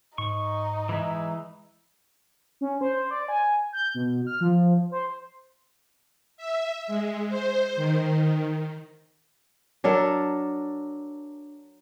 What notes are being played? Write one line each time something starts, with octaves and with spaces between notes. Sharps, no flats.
G#2 D#4 C#6
E3 G#3 E5
C#4
C5
D5
G#5
G6
B2
F6
F3
C5
E5
G#3
C5
D#3
F#3 D4 A4 A#4